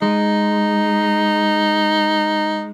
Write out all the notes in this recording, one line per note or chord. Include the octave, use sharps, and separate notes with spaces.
G#3 D#4